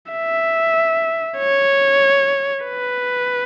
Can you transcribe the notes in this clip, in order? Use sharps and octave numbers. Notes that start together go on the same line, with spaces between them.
E5
C#5
B4